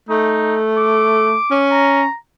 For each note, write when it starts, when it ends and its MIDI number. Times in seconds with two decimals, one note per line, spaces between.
0.09 1.35 57
0.09 0.57 63
0.77 1.59 86
1.51 2.05 61
1.71 2.15 82